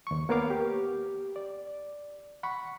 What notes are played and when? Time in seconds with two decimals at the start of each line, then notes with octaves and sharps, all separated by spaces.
0.07 D#2 C#6
0.29 A#3 B3 A#4 C#5 F5 D6
0.50 G4
1.36 D5
2.43 F#5 B5 C#6